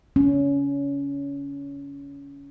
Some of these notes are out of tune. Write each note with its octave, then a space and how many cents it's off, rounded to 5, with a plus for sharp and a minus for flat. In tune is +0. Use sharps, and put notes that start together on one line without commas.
C#4 +20